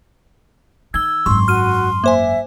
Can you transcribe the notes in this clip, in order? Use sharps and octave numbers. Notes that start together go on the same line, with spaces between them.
D#3 E6 G#6 G7
G#1 F#2 C6 C#6
F#4 F6 D#7
A#3 C5 E5 G#5